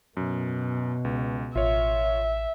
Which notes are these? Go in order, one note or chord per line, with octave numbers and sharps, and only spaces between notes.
F#2 B2
C#2
A1 F4 C#5 E5